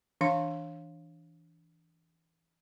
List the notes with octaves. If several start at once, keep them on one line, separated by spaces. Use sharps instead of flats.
E3 D4 F5 C6